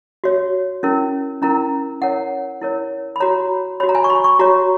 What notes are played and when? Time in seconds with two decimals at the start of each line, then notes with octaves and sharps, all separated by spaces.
0.24 F#4 C#5
0.83 C#4 E4 A#4
1.42 C#4 E4 A#4 A#5
2.02 E4 A#4 C#5 F#5
2.61 E4 A#4 C#5
3.16 B5
3.20 F#4 C#5 A#5
3.80 F#4 C#5 B5
3.89 A#5
3.95 G#5
4.04 C#6
4.10 B5
4.24 C#6
4.39 F#4 C#5 A#5